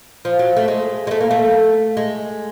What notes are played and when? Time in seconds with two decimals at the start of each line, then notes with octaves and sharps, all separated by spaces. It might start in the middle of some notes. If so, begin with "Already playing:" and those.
0.25 F3
0.39 F#3
0.57 A3
0.68 G#3
1.07 G#3
1.11 A3
1.21 A#3
1.31 A3
1.97 G#3